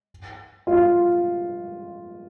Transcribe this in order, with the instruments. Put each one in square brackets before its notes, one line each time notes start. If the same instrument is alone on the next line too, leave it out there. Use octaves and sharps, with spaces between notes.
[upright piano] F4